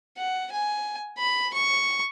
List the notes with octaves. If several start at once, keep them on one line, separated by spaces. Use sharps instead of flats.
F#5
G#5
B5
C#6